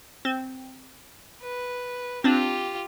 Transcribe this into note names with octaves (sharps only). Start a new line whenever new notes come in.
C4
B4
C4 D4 F4 G4